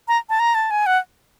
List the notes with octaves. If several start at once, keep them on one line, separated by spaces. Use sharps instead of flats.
A#5
A5
A#5
A5
G#5
F#5